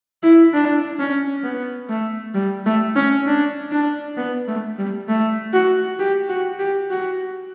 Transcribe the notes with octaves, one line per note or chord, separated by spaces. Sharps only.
E4
D4
C#4
B3
A3
G3
A3
C#4
D4
D4
B3
A3
G3
A3
F#4
G4
F#4
G4
F#4